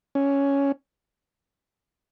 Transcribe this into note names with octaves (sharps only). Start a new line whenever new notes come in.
C#4